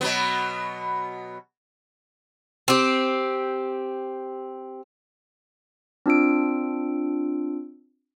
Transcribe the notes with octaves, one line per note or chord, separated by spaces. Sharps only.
B2 F#3 B3
C4 G4
C4 D4 F4 E6 D7